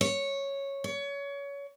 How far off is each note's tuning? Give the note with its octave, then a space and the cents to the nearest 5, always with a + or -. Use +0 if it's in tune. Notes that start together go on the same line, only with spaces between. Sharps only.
C#5 -5
C#5 +25